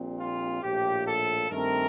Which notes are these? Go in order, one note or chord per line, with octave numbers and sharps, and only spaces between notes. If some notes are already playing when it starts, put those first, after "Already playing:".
Already playing: A#1 A#2 G3 C4
F4
A#1 A2 F3 G4
A4
G2 D#3 A3 C4 A#4